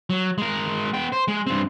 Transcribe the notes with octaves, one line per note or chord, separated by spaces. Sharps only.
F#3
G#3 A#4
B3 G5
C5
G#3
G2 C4